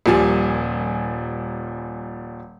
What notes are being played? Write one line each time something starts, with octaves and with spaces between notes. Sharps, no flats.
D#1 A#2 F3 G3 G#5